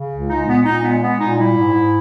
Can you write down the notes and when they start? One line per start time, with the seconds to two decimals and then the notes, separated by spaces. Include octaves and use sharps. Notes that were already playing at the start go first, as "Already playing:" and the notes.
Already playing: C#3
0.11 C#2
0.30 G#3 D#4
0.47 A#2 B3
0.65 A#2 D#4
0.83 G#3 B3
1.02 G#3 B3
1.20 A#2 D#4
1.38 G3 E4
1.56 G#2
1.74 G#2